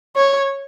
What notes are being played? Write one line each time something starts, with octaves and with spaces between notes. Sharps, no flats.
C#5